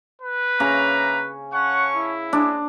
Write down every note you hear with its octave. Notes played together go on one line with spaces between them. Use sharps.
B4
C#3 A#3 E5 A#5
C#4 F#5 A5 C#6
E4
G#3 D4